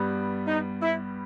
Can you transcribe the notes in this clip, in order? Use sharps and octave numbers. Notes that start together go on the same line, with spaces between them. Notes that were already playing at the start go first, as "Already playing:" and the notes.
Already playing: G2 G3 B3
D#4
E4